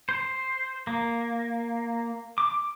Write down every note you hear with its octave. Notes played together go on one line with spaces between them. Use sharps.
C5
A#3
D6